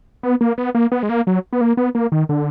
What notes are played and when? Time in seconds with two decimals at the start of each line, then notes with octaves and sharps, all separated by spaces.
0.23 B3
0.41 A#3
0.58 B3
0.75 A#3
0.92 B3
1.03 G#3
1.09 A#3
1.27 F#3
1.53 B3
1.61 A#3
1.77 B3
1.95 A#3
2.12 D#3
2.29 D3